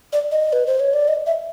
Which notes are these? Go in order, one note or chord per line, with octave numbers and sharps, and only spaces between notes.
D5
D#5
B4
C5
C#5
D5
D#5
E5